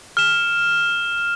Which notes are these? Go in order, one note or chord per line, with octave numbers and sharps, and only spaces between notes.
F6 E7